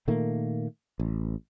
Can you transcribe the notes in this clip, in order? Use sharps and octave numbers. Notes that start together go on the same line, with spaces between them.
A#2 D#3 A3 A#3
A1